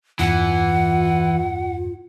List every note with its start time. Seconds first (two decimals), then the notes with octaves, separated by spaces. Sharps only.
0.19 E2 G2 E3 F4 F#5 C#7